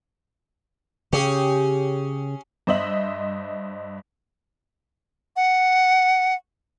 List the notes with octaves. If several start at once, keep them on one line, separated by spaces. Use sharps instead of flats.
C#3 C#4 G4 G#4
G2 C5 D#5 E5 F#7
F#5